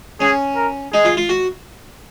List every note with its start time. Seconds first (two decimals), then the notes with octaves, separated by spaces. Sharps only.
0.20 C#4 G#4
0.56 A#4
0.93 D#4 G#4
1.05 F4
1.17 F4
1.29 F#4